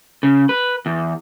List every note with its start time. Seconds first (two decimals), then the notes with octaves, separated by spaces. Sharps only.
0.23 C#3
0.49 B4
0.86 E2